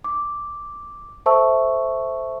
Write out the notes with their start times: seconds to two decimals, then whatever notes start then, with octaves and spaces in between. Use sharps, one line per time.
0.04 D6
1.26 A4 C5 E5 A5 C#6 E6